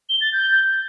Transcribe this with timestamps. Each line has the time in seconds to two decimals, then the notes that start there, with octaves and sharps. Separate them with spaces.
0.09 G7
0.21 A6
0.33 G6